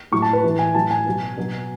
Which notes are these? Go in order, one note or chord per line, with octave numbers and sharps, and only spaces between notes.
A2 F#3 C#6
A5
B4
A2 E3
G#5
A2 F#3 A5
G#5
B2 F#3
B2 F#3